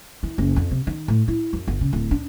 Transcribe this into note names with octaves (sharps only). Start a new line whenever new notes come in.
E3
F#1
F2
C3
D#3
A2
E4
F#2
G1
C#3
D1
D4